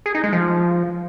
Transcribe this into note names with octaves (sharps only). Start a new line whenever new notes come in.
G#4
D#4
G#3
F3